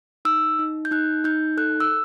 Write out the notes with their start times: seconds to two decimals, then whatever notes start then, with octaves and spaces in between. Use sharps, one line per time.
0.25 D#4 E6
0.59 D#4
0.85 G6
0.91 D#4 F#6
1.24 D#4 G6
1.57 A4 F#6
1.80 E6